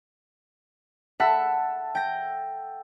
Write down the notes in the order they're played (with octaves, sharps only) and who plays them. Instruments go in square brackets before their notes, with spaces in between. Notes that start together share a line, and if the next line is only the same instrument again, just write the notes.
[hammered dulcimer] A4 [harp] E5 F#5 B5
[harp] G5 A#6